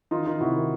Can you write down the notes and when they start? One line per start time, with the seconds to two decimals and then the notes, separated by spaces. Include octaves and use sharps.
0.11 D#3 D#4 F4
0.26 D#3 D#4 F4
0.40 C3 E4 F#4
0.56 D#3